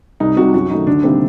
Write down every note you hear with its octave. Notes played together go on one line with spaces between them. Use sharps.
C2 D#4
C3 G3 F#4
F#2 F#4
D#3 A3 D#4
D2 D4
C3 D#3 G3 A#3 C4